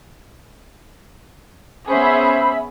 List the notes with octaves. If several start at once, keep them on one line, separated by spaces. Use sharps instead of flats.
B3 C#4 G#4 C5 E5 B5